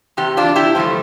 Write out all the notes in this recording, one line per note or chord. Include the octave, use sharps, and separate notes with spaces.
E2 C3 G4
D4 F4
E4 G4
G2 D3 F3 A3